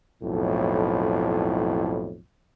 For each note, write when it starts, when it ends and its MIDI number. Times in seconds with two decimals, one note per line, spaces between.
0.22 2.19 35
0.22 2.19 41
0.22 2.19 45